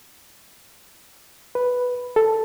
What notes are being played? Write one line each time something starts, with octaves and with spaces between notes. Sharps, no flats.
B4
A4